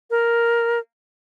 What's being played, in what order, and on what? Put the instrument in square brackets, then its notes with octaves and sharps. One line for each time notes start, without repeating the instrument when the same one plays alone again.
[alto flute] A#4